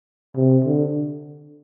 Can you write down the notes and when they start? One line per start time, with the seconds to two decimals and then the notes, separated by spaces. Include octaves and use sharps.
0.36 C3
0.65 D3